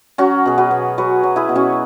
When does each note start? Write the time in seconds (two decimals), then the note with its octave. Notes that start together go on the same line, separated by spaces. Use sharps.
0.18 F#3 C#4 F#4
0.46 B2 G#4
0.58 F#4 B4
0.71 B2
0.98 F#3 F#4 B4
1.23 F#3
1.36 E4 G#4
1.49 B2
1.56 C#4 F#4